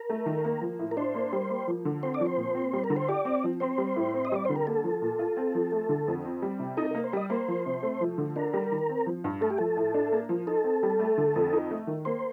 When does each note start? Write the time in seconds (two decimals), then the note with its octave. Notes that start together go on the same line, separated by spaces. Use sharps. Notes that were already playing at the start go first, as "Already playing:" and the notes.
Already playing: A#4
0.10 A3
0.26 D#3
0.45 A#3
0.61 F3
0.79 A2
0.91 A#4
0.97 D4 C5
1.15 A#3
1.33 G3
1.50 A#3
1.68 F3
1.85 D3
2.03 C4 C5
2.14 D5
2.20 F3
2.26 C5
2.37 A#2
2.55 C4
2.73 G3
2.84 A#4
2.90 D3
2.96 C5
3.08 G4 D5
3.25 C4
3.44 F3
3.60 C4 C5
3.78 G3
3.96 A2
4.14 C4
4.25 D#5
4.32 G3 D5
4.45 D3 C5
4.56 A#4
4.67 A#3 A4
4.84 F3
5.02 A#2
5.19 F4
5.37 C4
5.55 F3
5.72 A3
5.89 D3
6.08 F2
6.25 C4
6.42 G3
6.60 C3
6.77 D#4 A4
6.91 A#3 A#4
7.04 C5
7.13 G3 D#5
7.30 A#3 C5
7.48 F3
7.66 C3
7.83 A3
8.01 F3
8.18 D3
8.36 D4 A#4
8.53 G3
8.72 D#3
8.89 C4
9.06 F3
9.24 G2
9.41 A3 A4
9.50 G4
9.58 F3 A4
9.77 A2
9.94 D4
10.12 A#3
10.29 F3
10.47 D#4 A4
10.64 C4
10.83 G3
10.99 A3
11.18 D3
11.36 F2
11.53 D#4
11.71 A3
11.87 D#3
12.05 A#3 C5